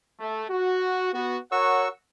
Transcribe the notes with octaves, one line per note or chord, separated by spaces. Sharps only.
A3
F#4
B3 F#4
F#4 A#4 C#5 F#5 C#6 E6